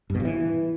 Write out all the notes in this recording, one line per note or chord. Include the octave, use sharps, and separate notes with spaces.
G2
B2
G2
E3